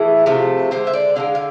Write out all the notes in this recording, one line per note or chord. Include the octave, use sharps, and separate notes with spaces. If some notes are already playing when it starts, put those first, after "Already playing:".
Already playing: A2 E3 G#4
C3 F3 A3
D3 G#3 C5
E5
D5
D3 F3 G#3 F5
F5